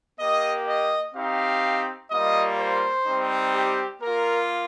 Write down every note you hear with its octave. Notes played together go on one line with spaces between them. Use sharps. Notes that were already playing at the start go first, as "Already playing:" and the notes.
A#3 G4 D#5
D#5
C4 D#4 G4 F5
G3 A#3 F4 D#5
C5
G3 C4 D#4
G4
A#3 F4 A#4